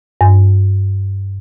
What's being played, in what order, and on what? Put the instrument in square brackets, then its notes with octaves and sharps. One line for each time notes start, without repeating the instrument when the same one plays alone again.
[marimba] G2